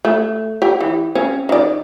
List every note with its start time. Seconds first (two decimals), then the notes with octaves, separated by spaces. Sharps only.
0.05 A3
0.62 G4 G5
0.81 E3
1.15 C4 C#4
1.49 D#3 D5